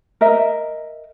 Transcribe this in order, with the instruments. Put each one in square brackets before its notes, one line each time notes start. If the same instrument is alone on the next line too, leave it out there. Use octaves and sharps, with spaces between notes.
[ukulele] A#4 D#5 E5